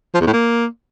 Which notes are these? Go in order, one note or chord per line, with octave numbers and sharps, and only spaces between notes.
F3
E2
A2
A#3